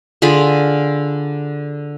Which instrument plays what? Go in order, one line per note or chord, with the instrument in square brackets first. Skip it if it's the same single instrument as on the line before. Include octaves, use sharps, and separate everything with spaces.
[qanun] D3 F4 G#4 B5